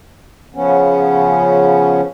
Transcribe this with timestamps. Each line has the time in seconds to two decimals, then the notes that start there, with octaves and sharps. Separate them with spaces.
0.55 C#3 F3 B3 C#4